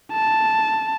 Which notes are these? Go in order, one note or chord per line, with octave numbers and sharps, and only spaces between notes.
A5